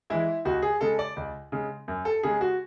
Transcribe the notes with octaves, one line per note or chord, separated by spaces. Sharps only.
E3 G#3 E4
C#2 F#4
G#4
C#3 G#3 A4
D5
C#2
C#3 G#3
F#2
A4
C#3 G#3 G#4
F#4